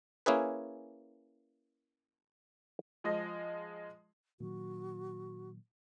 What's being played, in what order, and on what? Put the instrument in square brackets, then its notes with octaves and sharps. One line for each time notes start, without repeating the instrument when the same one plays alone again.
[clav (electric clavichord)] A#3 C#4 E4 G#4 B4
[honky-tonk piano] F3 G#3 D#5
[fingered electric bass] A#2 D#3 F#3 [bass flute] F#4